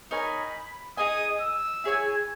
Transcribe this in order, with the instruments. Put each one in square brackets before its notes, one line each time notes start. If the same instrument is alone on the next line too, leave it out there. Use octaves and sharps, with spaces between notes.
[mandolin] D#4 A#4 C#5 G#5 [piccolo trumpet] B5
[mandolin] D#4 G#4 D#5 G#5 [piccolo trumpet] D#6
[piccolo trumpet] E6
[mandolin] E4 G#4 C#5 G#5